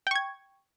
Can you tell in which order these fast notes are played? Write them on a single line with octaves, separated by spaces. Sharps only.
G5 C#6 G#6